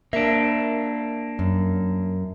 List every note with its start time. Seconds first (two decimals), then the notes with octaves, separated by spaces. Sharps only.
0.13 A#3 D4 E5
1.39 F#2